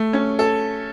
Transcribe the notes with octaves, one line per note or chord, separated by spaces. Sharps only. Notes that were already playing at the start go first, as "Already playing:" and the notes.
Already playing: A3
C#4
A4